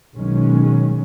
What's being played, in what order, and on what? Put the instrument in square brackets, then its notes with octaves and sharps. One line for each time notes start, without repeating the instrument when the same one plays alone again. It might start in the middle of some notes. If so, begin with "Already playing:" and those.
[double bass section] B1 D#3 F#3 G#3 C#4